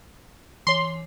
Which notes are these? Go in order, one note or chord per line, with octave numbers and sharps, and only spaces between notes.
E3 C#5 C6 C7